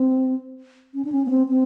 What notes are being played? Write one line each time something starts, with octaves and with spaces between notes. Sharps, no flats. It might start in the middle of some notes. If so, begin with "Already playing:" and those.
Already playing: C4
C#4
D4
C#4
B3
C4
C4